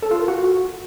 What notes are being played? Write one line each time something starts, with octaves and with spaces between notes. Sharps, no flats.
A4
F4
A#4
F#4